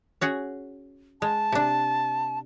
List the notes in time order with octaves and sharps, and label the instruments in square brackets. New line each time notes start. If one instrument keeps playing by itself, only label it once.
[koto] C#4 F#4 G#4
[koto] G#3 [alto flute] A5
[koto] C3 D4